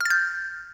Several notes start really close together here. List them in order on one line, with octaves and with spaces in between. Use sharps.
F6 A6 G6